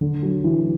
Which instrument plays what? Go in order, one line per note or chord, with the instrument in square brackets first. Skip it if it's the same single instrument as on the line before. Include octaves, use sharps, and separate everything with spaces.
[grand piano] D3
F#3
E3